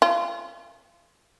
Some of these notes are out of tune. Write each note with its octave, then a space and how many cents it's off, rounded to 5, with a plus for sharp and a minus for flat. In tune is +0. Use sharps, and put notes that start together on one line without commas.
F4 -30